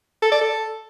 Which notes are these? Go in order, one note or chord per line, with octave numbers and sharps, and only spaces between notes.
A4
D5
A4